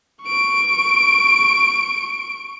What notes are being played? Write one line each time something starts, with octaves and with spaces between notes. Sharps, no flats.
C#6 D7